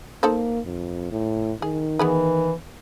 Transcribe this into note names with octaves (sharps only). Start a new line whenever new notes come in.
A#3 D#4 A4 C5
F2
A2
D#3 G#4
E3 B3 G#4 B4